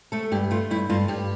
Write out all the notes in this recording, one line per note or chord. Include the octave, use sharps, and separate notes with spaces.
A3 A4
G2 G4
A3 F4
G2 E4
G2 F4
G2 G4